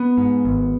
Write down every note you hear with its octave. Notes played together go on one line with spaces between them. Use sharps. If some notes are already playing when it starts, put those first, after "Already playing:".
Already playing: B3
G#2
G#1